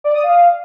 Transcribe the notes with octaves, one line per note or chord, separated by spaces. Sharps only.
D5
D#6
F5